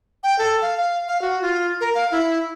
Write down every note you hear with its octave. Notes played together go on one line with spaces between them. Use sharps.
G5
A4
F5
F5
F5
F#4
F4
A#4
F5
E4